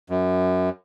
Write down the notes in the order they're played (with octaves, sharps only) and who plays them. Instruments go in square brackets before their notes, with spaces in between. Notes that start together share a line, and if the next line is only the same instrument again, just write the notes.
[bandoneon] F#2